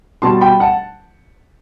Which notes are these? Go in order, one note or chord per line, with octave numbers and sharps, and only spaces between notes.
B2 G3 A5 C6
G5 B5
F#5 A5